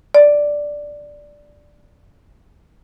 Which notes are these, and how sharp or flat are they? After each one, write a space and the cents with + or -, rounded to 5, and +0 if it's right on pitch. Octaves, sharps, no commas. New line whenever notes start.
D5 +0